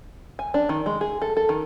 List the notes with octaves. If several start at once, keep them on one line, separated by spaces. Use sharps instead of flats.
G#5
D4
D#3
G#3
G#4
A4
A4
D#3